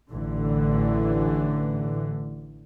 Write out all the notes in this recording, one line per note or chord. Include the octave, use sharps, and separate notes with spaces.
A1 D3 E3